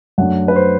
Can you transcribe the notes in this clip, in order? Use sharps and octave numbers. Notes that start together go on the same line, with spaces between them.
F#2 F#3 A3 D4 F#5
B4
C5